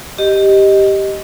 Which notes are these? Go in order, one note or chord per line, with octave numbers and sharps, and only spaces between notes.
G4 D#5